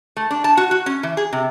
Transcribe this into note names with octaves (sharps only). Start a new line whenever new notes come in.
A3
D4
A5
F#4
F#4
C#4
E3
G#4
C3